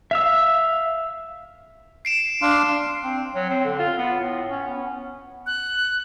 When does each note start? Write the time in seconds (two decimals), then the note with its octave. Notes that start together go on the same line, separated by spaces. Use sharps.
0.11 E5 F5 E6
2.05 C7 D7 E7
2.42 D4 F5 C6
3.04 C4
3.35 F#3
3.50 C4
3.65 D3
3.79 F4
3.98 B3
4.20 A2
4.49 C#4
4.68 B3
5.46 F#6